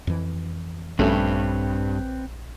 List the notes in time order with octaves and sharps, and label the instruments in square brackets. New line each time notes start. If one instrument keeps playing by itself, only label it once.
[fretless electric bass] F2 E3
[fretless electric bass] A#1 [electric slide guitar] G2 [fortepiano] D3 A3 C#4 [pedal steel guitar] C4 B4 C#5